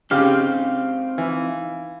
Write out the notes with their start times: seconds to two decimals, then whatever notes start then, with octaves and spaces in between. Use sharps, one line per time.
0.11 C#3 C4 D#4 G4 C5 F5
1.18 E3